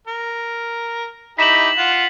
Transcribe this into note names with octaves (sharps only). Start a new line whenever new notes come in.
A#4
D#4 E4 G4 B6 E7 F#7
F4 F#5